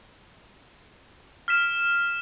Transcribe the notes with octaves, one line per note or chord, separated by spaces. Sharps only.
F6 B6 E7